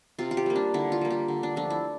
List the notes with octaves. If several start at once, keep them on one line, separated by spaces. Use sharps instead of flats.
C3 F4
F4
G4
G3 A#3
D4
D3 E4
F4
G3 A#3
G4
D3
D4
F3 A3 D4
E4